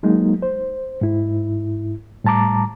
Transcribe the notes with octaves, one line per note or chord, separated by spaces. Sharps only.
F#3 G#3 A#3 D#4
C5
G#2 E4
A2 G3 A5 A#5 D6